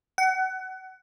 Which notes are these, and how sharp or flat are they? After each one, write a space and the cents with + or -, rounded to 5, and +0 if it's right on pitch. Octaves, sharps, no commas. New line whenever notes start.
F#5 +30